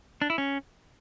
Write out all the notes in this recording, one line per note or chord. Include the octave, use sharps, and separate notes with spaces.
D4
E4
C#4